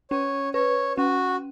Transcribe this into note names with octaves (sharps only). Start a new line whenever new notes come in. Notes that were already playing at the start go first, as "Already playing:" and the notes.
C#4 C#5
B4 C#5
C#4 F#4